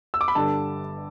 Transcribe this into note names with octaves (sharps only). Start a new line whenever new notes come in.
E6
D6
B5
G1 G2 D3 G3 A5